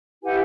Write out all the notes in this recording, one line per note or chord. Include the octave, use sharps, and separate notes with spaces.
E4 G4 B4 F#5 G#5